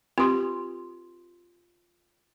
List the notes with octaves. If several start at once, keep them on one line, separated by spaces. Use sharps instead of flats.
C4 F4 G4 B4 C6